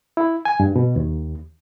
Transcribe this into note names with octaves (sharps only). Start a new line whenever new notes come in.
E4
G#5
G2
B2
D#2